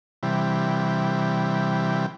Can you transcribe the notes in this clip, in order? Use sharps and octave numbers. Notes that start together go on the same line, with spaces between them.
C3 E3 G3